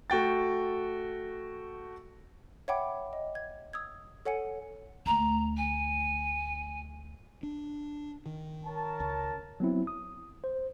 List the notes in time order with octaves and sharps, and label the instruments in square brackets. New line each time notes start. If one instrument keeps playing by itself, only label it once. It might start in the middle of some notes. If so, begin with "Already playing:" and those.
[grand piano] A3 F#4 G5 A6
[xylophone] C#5 E5 F#5 G5 B5 D6
D#5
G#6
D#6 E6 G#6
A4 C#5 F#5 G#5 C#7
[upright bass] D2 A3 [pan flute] A#5
[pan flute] G#5
[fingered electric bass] D4
D#3
[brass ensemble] A#4 C#5 A5
[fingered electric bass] C#2
[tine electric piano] F#3 B3 C4 E4
D#6
C5